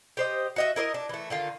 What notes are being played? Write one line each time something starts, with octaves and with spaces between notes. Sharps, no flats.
G4 C5 D#5
F#4 D#5 E5
E4 A#4 D5 D#5
D4
E3 A3
D3 D#3 F4